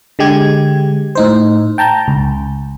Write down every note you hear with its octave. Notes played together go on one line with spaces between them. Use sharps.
D3 G#3 G4 G#6
A2 D#4 C5
G5 A5 A#5 G6
C#2